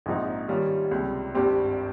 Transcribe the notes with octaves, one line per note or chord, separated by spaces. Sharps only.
A#1 G#2 F3 C4 D#4
D#3 G3 C#4 F4
C#2 C3 G3
G#1 G2 G3 C4 G4